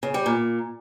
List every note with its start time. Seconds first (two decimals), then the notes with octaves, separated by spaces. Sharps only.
0.03 C#3
0.14 G3
0.26 A#2